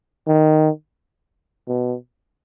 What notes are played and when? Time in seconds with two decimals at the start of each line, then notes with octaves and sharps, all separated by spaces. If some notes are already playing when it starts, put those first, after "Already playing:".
0.27 D#3
1.67 B2